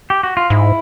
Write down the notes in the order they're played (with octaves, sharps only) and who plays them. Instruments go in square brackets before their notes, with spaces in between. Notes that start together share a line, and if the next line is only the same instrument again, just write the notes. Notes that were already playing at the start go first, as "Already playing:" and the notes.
[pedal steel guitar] G4
F#4
F4
[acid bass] G#2 [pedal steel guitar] E4